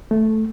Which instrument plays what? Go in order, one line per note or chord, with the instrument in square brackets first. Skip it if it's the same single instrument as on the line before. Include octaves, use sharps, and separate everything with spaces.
[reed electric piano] A3